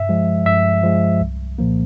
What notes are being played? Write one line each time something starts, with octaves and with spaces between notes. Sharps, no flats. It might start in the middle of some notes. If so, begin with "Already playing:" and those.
Already playing: G2 E5
F3 G#3
G2 E5
F3 G#3
C2
A#2 F3 A#3